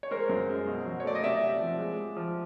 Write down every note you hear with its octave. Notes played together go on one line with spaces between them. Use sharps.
C#5
G#3 A#4 C5
F#2
G#3
B2
F#3
C#5
A3 D5
D#5
C3 D5 E5
C3
F3
G#3
G#3
F3